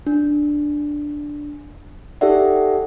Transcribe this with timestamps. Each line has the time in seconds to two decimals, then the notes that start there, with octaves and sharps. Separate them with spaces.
0.07 D4
2.21 D#4 G4 A4 D5 E5 F#5